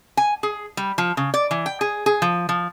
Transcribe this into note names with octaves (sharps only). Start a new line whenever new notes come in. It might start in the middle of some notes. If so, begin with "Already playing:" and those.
G#5
G#4
G3
F3
C#3
D5
E3
G5
G#4
G#4
F3
F3